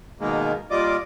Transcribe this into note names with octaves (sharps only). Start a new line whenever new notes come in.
B2 D#3 G#3 A#3
A#2 G3 F4 D5 D#5 D6